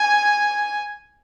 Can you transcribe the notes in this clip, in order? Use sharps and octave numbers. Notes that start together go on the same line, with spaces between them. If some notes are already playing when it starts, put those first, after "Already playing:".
Already playing: G#5